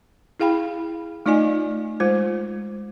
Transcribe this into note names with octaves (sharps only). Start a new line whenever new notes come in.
E4 G#4 F5 G5 B5
A3 D#4 F4 D5 D#5 G#5
G#3 F4 C5